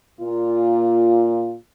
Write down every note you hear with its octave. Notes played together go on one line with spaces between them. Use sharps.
A#2 F4